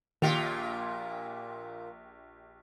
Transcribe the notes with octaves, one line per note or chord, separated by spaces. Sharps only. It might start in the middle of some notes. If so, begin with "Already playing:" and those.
A#1 A#2 D#3 F4 G4 F7